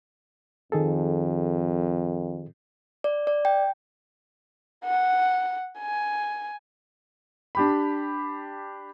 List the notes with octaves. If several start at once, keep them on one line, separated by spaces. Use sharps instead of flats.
F2 D#3 G#4 A4
D5
D5
G5
F#5
G#5
D4 G4 B5